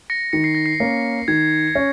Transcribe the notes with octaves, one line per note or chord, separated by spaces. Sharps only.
A#6 C#7
D#3 C#7
C7
A#6
C7
A#3 C#4
D#3 G#6
C#4